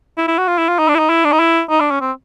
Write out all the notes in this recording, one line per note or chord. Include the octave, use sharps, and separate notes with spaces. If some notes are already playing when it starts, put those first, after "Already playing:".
E4
E4
F#4
F4
E4
F4
D#4
D4
E4
D#4
E4
D4
D#4
E4
D#4
D4
C#4
C4